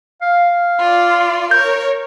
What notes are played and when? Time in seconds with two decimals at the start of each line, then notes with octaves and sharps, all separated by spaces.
0.22 F5
0.79 F4 D5
1.51 A#4 C#5 G6